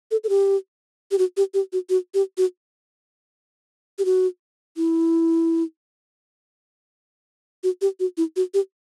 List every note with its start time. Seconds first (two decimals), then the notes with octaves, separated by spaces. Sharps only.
0.11 A4
0.24 A4
0.29 G4
1.11 G4
1.18 F#4
1.37 G4
1.54 G4
1.73 F#4
1.90 F#4
2.14 G4
2.38 F#4
3.99 G4
4.05 F#4
4.77 E4
7.63 F#4
7.81 G4
8.00 F#4
8.17 E4
8.36 F#4
8.54 G4